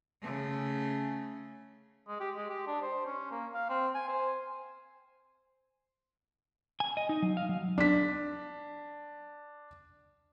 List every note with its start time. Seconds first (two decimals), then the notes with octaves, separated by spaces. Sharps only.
0.22 C#3 A3
2.08 G#3
2.20 G4
2.36 G#3
2.50 G4
2.67 D4
2.82 C5
3.06 C#4
3.31 A#3
3.54 F5
3.70 C4
3.95 G#5
4.09 C5
6.80 G#5
6.97 D#5
7.09 D#4
7.22 F#3
7.37 F5
7.49 F#3
7.78 D4 B6